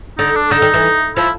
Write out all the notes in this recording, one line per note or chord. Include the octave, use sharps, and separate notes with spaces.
D3 D#4
D4
D3 D#4
D#3
E3
F3 E4